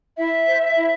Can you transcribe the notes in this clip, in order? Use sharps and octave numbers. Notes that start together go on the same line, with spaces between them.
E4 E5
C5
E4